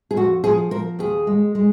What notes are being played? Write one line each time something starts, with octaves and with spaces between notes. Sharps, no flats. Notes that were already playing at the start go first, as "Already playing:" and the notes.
G#4
F2 F#4
F3 G#4
F3 A#4
D#2 G#4
G#3
G#3